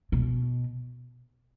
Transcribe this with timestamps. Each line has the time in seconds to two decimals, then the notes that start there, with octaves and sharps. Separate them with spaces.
0.12 B2